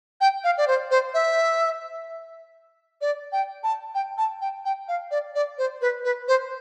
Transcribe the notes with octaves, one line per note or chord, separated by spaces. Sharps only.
G5
F5
D5
C5
C5
E5
D5
G5
A5
G5
A5
G5
G5
F5
D5
D5
C5
B4
B4
C5